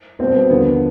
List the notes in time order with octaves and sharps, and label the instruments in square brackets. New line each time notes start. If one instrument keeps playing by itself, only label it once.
[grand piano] B1 B2 G3 C4
B3
D#2 D3 F3 B3